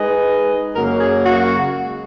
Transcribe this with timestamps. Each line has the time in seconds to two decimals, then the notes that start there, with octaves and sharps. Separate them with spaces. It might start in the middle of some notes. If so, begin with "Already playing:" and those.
Already playing: G#3 D#4 G#4 B4 D#5
0.75 F#2 C#3 F#3 A#3 A#4
1.00 G#4
1.26 F#4
1.76 G#3